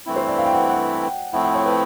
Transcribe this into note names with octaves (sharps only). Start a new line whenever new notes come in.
G2 E3 A3 C4 E4
C5
D5
F5
G5
F#5
F#5
G5
A2 F3 A3 C4 E4 F#5
F#5
C#5
B4